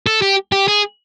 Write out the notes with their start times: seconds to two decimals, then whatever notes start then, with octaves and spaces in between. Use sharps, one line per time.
0.07 A4
0.22 G4
0.52 G4
0.68 G#4